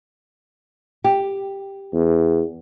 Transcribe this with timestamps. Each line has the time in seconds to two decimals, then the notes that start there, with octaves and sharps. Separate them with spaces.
1.04 G4
1.93 E2